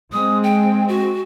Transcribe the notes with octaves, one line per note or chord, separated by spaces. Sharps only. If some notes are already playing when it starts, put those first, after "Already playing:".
G#3 C4 D#6
G5
F#4